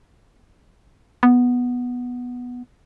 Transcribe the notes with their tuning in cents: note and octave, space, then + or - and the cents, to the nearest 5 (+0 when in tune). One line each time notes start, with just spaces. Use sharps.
B3 -5